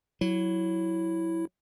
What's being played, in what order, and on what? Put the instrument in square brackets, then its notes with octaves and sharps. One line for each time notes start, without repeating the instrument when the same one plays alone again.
[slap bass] F#3 [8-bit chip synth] E4